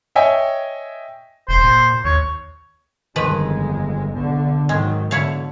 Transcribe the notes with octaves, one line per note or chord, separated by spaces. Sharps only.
C#5 D#5 E5 G5 G#5
E1 C5
A#2
D#2 C#5
G1 F2 D#3 F3 G#3 B4
B1 D3
G#2 D#3 F#3 G#3
B2 D3 E4 C#5 F5